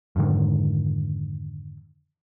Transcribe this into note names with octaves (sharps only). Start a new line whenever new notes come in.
F2 G#2 D3 D#3